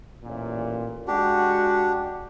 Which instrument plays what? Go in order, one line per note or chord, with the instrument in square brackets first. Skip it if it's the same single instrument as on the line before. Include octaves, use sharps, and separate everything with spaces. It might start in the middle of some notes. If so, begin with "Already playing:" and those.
[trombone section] A1 A#2
[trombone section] G#3 F#4 [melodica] D4 G4